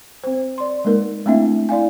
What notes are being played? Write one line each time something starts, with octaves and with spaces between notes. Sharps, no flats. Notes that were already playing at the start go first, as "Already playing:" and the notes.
C4 C5
D5 C6
G#3 A#3 D#4 A#4 B4
A3 A#3 C4 D4 E4 E5
E4 D5 F5 G#5